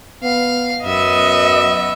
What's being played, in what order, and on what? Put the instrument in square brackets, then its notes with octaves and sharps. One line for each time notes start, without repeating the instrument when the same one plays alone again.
[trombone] B3 [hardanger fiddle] F5
[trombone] F#2 [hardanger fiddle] B3 E5 [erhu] D#5